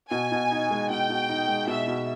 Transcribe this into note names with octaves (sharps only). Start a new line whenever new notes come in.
B2 G#5
B2
D#4
G#3
B2 G5
B2
D#4
G#3
B2 E5
B2